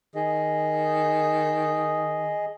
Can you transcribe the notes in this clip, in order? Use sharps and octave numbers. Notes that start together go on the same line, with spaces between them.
D#3 G#4 D#5